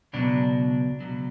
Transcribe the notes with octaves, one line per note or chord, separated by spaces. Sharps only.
C#2 B2 F#3 D4
C#2 B2 F#3